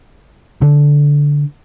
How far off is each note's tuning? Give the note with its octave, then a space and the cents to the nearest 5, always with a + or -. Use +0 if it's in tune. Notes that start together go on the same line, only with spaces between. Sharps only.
D3 -15